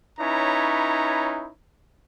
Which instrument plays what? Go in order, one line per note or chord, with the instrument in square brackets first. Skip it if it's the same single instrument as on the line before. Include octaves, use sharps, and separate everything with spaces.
[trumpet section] C#4 D#4 E4 B4 C#5 A#5